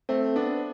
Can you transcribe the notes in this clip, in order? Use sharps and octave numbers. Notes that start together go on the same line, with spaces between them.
A3 C4
B3 D4